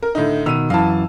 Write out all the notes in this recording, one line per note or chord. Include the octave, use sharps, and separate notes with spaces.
A#4
A2 D3 D#4
B2 D#3 E6 D#7
F#2 E3 F5 A5